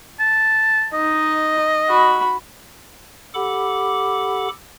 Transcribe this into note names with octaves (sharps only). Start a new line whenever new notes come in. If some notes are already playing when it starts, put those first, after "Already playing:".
A5
D#4 D#5
F#4 B5
G4 A4 F#5 B5 D6